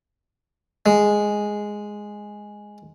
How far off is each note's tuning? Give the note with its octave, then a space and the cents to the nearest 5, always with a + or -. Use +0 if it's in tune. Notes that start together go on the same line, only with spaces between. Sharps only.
G#3 +0